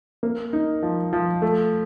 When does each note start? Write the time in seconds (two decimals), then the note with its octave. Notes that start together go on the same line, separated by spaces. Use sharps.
0.23 A#3
0.53 D#4
0.83 F3
1.13 F3
1.42 A3